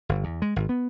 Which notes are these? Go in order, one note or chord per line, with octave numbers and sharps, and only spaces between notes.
G1
E2
G#3
G#1
B3